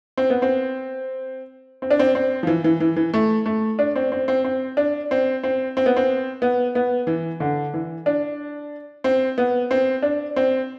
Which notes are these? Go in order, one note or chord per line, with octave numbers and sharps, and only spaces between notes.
C4
B3
C4
C4
D4
C4
C4
F3
E3
E3
E3
E3
A3
A3
D4
C4
C4
C4
C4
D4
C4
C4
C4
B3
C4
B3
B3
E3
D3
E3
D4
C4
B3
C4
D4
C4